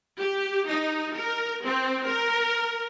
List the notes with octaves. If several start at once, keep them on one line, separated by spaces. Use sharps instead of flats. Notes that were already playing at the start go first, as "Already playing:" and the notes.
G4
D#4
A#4
C4
A#4